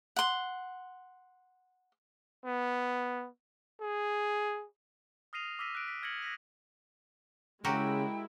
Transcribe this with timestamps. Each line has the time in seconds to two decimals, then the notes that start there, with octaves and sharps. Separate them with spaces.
0.16 F#5 C6
2.45 B3
3.81 G#4
5.33 D#6 F6 A#6 C7 D#7 F7
5.59 D6 E6 F6 A#6 B6 D#7
5.75 F#6 D7
5.88 B6
6.03 F6 G#6 A#6 B6 C#7 F#7
6.22 A#6 B6 D#7
7.64 C#3 G#3 E4 F#4 G4 A#4 G5